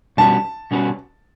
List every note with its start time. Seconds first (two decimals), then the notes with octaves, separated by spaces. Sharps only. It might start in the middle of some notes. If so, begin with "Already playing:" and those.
0.17 B2 G3 C#4 F#4 B4 A5
0.71 B2 G3 C#4 F#4 B4